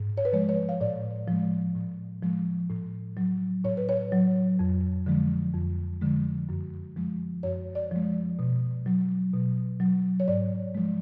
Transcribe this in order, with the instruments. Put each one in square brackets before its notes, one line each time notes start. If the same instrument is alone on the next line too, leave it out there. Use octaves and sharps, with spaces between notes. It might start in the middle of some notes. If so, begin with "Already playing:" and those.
Already playing: [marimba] G#2
C#5
B4
F3 G#3 C#5
C#5
F5
A2 D5
F3 G#3
A2
F3 G#3
A2
F#3
A2 C#5
B4
C#5
F#3
F2
D3 F3 G#3
F2
D3 F3 G#3
F#2
F3 G#3
F#2 C#5
D5
F3 G#3
B2
F#3
B2
F#3
C#5
G#2 D5
F3 G#3